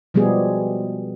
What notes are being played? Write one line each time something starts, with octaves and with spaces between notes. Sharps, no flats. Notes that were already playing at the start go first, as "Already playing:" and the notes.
B2 F3 G3 G#3 B3 G#4